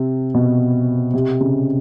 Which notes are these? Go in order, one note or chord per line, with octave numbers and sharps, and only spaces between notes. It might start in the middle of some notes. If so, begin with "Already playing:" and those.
Already playing: C3
B2
C3
C#3